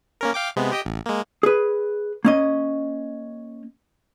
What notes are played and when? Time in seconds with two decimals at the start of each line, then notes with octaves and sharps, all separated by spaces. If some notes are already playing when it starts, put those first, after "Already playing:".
0.21 A#3 C#4 A#4
0.34 F5 G5 D6
0.56 C3 G#3 B3
0.72 G4 D#5 G5
0.85 A1
1.06 G#3 A#3
1.43 G#4 B4
2.25 A#3 C#4 D#5